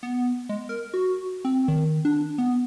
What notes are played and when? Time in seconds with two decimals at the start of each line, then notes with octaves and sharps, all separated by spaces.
0.03 B3
0.49 G#3
0.69 A#4
0.94 F#4
1.45 C4
1.68 D#3
2.05 D4
2.38 B3